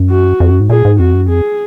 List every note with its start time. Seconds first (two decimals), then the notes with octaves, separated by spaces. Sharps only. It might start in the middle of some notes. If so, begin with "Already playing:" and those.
Already playing: F#2
0.10 F#4
0.40 F2
0.50 F#2
0.60 G#2
0.70 A#2 G#4
0.85 G#2
0.99 F2 F#4
1.14 F#2
1.28 F2 G#4